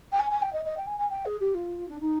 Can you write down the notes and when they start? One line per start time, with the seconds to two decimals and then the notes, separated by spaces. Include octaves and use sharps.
0.12 G5
0.19 G#5
0.30 G#5
0.41 G5
0.52 D#5
0.64 D#5
0.77 G5
0.86 G#5
0.98 G#5
1.09 G5
1.25 G#4
1.40 G4
1.54 F4
1.88 D4
2.00 D#4